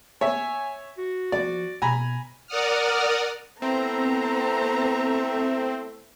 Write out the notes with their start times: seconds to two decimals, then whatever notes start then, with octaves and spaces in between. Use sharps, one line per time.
0.21 C#5 E5 G#5
0.98 F#4
1.32 F3 D5
1.82 B2 G#5 A#5 B5
2.47 A#4 D5 F#5 D#6 F6
3.62 A3 B3 C4 E4 C5 E5 A#5